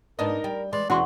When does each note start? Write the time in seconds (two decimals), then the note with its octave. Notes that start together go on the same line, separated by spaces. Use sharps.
0.19 G#2 B3 D4 D#4 A#4 D#5
0.44 G3 G5
0.73 E3 G#3 D5 C6
0.90 E1 E3 C#4 F#4 D5 F#5 C6 C#6